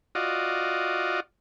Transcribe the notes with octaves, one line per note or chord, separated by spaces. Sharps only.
F4 F#4 D5 D#5